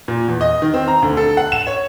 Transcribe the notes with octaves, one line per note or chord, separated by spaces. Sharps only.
A#2
E2
D#5
D#3
C4
A#5
D2
A4
F#5
E7
C#5